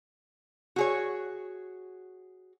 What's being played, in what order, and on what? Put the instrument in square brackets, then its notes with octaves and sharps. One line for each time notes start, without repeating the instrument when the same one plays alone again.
[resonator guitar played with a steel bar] F#4 G#4 C#5